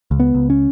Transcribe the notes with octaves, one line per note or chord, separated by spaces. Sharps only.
C#2
B3
C#2
C#4